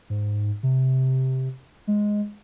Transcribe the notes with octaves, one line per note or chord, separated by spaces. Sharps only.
G#2
C3
G#3